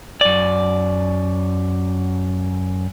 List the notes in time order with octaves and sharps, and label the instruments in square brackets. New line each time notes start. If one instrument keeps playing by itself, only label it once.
[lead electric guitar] F#2 D5